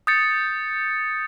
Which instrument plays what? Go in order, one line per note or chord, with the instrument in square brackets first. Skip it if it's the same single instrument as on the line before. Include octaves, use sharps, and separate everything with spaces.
[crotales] D#6 G6 A6 C#7